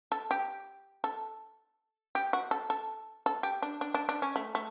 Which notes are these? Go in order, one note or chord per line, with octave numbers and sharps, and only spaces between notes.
A4
G4
A4
G4
F#4
A4
A4
A4
G4
D4
D4
D4
D4
C#4
A3
A3